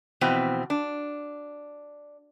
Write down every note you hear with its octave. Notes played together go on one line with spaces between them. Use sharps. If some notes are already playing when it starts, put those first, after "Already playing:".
F2 B2 E3 C4
D4